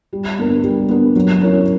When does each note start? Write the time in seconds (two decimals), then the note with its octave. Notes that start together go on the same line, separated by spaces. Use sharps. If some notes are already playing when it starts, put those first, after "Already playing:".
0.13 G3
0.39 B3 D4 A#4
0.64 G3
0.89 B3 D4 A#4
1.16 F#3
1.42 C#4 E4 A#4 C#5